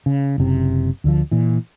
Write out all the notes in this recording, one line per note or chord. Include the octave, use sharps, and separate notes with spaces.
C#3
F#1 C3
D2 D3 F3
A#2 E3